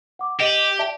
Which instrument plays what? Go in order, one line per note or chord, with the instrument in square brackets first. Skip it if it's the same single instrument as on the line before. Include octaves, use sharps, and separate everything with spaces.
[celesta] F#5 D6
[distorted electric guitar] G4 [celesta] D#5 D#7 F#7
[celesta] D5 E5 A5